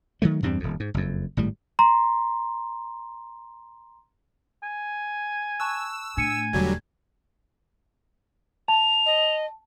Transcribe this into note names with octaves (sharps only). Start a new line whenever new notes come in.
D#3 F#3 A3
E2 G2 G3 C4
D#1 F2
G#2
F#1 F2
G#1 A2 G3
A#5 C6
G#5
A5 C#6 E6 F#6
A2 D4 G#5 C#7 D#7
E1 D3 F#3 G3 G#6
A5 F7
D#5